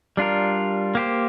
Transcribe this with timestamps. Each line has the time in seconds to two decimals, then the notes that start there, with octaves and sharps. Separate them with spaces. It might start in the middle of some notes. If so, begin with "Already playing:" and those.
0.17 G3 D4 F4 A#4
0.95 A#3 G4 C5